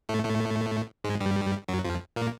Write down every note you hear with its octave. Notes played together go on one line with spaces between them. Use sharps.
A2 A3
A2 A3
G#2 G#3
G2 G3
F#2 F#3
F2 F3
A#2 A#3